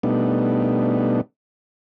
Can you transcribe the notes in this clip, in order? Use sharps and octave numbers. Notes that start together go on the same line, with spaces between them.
B2 G3 A3 B3 D4 D#4